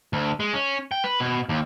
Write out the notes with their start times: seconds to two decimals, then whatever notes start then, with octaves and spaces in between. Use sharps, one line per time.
0.13 D2
0.40 G#3
0.53 C#4
0.92 G5
1.04 B4
1.20 B2
1.49 D#2